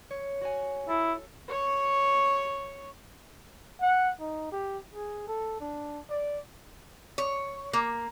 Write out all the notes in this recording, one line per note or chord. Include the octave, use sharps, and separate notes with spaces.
C#5
F#4 C#5 G#5
E4 A4
C#5 C#6
F#5
D#4
G4
G#4
A4
D4
D5
C#5
A#3